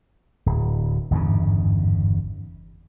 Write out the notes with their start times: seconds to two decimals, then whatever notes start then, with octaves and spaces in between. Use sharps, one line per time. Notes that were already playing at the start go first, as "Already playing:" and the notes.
0.46 D1
1.11 G1 E2 G#2 C#3